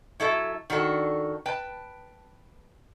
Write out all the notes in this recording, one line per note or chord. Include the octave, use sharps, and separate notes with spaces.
F#3 E4 A4 E5
D#3 D4 F#4 A4
B4 G5 A5